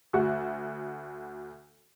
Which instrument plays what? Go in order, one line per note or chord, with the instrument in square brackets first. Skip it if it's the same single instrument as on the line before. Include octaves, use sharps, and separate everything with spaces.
[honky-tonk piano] D2 F#4